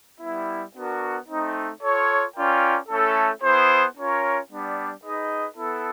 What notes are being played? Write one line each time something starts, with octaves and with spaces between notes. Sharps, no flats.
G3 B3 E4
B3 D4 F#4 A#4
A3 C4 D#4
F4 A4 C#5
C#4 F4 A#4 D5 G5
A3 C#4 E4 A4
B3 E4 G#4 C5
C#4 F4 A#4 C#5
G3 B3 D4
D#4 G#4 B4 D#5
B3 E4 A4